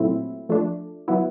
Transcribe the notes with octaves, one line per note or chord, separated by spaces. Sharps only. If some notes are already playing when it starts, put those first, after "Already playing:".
Already playing: A#2 F#3 A3 C4 E4
F3 A3 D4
F#3 B3 E4